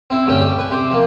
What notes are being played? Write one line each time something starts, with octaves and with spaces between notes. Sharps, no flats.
C4 E4
D2 G2 A3 C#4 G5
G3
B4 G#5
C3 C5 D6
F3 A#3